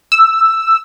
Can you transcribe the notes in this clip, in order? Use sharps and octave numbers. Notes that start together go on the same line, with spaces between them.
E6